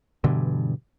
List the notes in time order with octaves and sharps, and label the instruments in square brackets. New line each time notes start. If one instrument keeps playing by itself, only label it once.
[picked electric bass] G2 B2 D3 E3